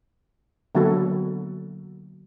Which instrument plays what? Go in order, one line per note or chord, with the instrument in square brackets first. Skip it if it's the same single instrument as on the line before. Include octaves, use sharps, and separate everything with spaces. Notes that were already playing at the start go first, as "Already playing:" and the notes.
[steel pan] D3 F#3 A#3 B3 F#4 A4